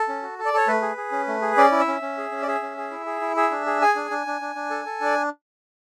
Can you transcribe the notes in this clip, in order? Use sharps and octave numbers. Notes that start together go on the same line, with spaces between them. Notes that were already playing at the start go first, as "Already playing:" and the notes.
Already playing: A4
C#4
F#4
A4
D5
A4 C#5
A3 B4
G#4
G#4
C#4
A3
G#4
C#4 D5
E4
E5
C#4
C#4
G#4
C#4
D5
G#4 E5
C#4
G#4
E4
G#4
E4
G#4 E5
D4
G#4
G#4 G#5
D4
D4
D4
D4
D4
A4
A4
D4 D5